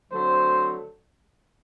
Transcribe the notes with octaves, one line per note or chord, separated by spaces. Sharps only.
D3 F#3 A3 C4 C5